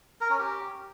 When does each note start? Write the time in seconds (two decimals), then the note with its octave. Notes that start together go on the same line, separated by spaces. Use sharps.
0.21 A#4
0.30 C#4
0.39 G4